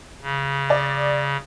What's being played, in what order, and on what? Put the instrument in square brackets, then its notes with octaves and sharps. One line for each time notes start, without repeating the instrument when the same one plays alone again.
[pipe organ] C#3
[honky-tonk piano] D5